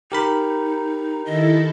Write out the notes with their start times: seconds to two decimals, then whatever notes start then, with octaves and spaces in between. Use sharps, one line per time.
0.12 D#4 G4 A#4 B5
1.26 D#3 E4 A4 D#5